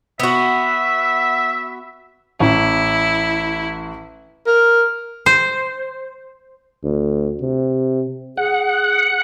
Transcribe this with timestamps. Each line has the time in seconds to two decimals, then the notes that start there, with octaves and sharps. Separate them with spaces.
0.20 B3 F#4 E5
2.40 A1 E4
4.47 A#4
5.26 C5
6.83 D2
7.41 C3
8.37 G#4 F#5